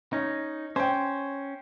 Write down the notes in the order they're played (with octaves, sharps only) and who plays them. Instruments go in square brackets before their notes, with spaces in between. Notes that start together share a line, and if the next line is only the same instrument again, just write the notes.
[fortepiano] C#4 [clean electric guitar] D#4
[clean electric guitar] C#4 [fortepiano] C5 G5